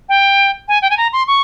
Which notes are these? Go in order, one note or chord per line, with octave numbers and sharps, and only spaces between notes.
G5
G#5
G5
G#5
A#5
C6
C#6